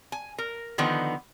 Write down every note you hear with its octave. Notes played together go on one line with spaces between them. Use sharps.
G#5
A#4
D3 D#3 F3 B3 D#4